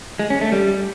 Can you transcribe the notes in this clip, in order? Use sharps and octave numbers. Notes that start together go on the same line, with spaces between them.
G#3
C#4
A3
G3